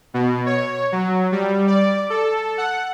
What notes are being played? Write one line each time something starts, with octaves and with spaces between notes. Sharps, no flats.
B2
C#5
F#3
G3
D5
A4
F#5